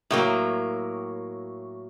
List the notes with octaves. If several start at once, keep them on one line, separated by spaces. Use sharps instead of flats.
A2 F#3 A#3